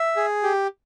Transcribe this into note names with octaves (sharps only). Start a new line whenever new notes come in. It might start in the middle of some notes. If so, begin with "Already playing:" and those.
Already playing: E5
G#4
G4